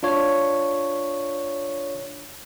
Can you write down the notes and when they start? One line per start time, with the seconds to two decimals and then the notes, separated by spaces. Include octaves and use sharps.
0.03 D4 F4 C#5